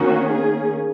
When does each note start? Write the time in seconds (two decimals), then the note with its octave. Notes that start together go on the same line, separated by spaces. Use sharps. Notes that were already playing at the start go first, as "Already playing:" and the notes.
Already playing: D#3 A#3 C#4 F#4
0.26 G#4